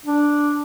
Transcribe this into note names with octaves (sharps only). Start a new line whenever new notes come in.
D4